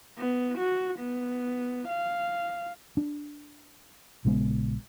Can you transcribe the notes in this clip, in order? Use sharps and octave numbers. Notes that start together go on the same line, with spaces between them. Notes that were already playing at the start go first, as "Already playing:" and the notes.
B3
F#4
B3
F5
D4
A#1 C#3 G#3 B3